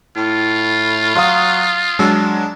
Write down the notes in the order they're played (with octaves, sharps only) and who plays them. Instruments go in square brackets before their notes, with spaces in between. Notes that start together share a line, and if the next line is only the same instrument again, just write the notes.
[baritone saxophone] A2 [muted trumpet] F4
[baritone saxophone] F#3 [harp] F5 F6 [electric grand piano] C6 D#6
[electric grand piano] F#3 G#3 [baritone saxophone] D4 [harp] E6